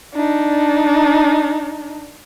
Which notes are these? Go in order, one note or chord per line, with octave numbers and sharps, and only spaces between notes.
D4 D#4